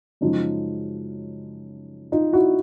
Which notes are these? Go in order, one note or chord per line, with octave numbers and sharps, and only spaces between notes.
F#2 C#3 F3 G#3 D#4
D#4 F4
E4 F#4